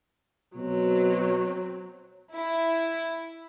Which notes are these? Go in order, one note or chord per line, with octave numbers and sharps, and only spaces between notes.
B2 F#3 C4
E4